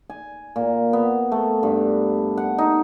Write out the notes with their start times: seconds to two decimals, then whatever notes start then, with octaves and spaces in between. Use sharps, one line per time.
0.10 G#5
0.56 A#2
0.93 B3
1.32 A3
1.63 G2
2.37 F#5
2.58 D#4